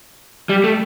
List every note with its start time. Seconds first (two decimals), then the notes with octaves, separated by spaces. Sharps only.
0.49 G3
0.64 A3